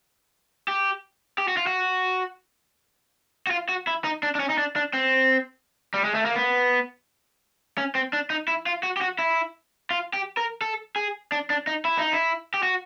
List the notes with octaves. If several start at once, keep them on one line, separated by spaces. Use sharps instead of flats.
G4
G4
F#4
F4
F#4
F#4
F4
F#4
E4
D#4
D4
D4
C#4
D#4
D4
D4
C4
G3
G#3
A3
A#3
B3
C#4
C4
D4
D#4
E4
F4
F#4
G4
F#4
E4
F4
G4
A#4
A4
G#4
D4
D4
D#4
E4
D#4
E4
G4
F#4